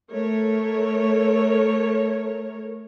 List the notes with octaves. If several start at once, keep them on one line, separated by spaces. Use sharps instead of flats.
A3 A#4 C#5